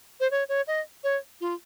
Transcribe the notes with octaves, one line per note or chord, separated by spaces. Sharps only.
C5
C#5
C#5
D#5
C#5
F4